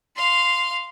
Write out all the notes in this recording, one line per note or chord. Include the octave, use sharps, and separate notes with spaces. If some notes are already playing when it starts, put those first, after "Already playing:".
F5 C6